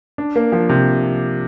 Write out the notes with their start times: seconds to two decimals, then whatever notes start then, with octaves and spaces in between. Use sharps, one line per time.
0.18 D4
0.36 A#3
0.52 F3
0.69 C3